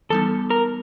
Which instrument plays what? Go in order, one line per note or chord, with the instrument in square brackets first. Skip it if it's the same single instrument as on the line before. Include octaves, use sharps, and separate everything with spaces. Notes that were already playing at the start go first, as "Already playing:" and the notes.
[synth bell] E3 G3 B3 D#4 [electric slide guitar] A4
[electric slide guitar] A#4